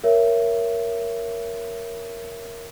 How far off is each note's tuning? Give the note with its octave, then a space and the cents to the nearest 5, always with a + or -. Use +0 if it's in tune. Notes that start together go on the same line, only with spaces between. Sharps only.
A#4 +0 C#5 +0 E5 +25